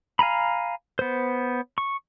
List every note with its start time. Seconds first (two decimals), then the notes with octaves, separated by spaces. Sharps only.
0.19 F5 G#5 A#5 B5
0.99 B3 C5
1.78 C#6